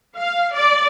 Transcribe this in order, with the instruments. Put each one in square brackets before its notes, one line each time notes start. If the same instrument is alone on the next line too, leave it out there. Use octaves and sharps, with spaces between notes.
[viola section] F5
D5